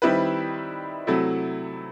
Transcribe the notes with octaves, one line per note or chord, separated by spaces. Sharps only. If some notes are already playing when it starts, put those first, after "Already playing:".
D#3 G3 C4 E4 B4
C3 F#3 A3 E4 A4